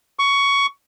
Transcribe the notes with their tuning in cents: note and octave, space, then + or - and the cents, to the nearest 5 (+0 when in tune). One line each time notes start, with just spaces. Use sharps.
C#6 +15